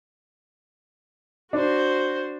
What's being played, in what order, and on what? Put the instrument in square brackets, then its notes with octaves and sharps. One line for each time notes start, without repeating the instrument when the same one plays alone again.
[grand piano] D4 [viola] F#4 C5